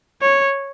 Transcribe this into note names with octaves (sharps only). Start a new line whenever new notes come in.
C#5